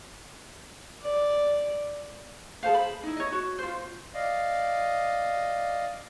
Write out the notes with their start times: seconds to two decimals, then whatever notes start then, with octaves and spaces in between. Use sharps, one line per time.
1.02 D5
2.63 G#4 A4 C5 F5
2.75 B5
3.03 D#4 E4
3.17 C#5 D#5
3.32 F#4
3.59 F4 C5
4.14 D5 D#5 F5